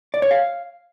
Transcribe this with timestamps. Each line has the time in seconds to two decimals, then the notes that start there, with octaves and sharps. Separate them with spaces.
0.14 D5
0.22 C#5
0.31 F5